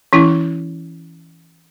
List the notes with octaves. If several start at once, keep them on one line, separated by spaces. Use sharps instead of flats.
E3 C#4 E4